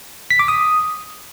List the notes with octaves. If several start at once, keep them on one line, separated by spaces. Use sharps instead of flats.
B6
D6
D#6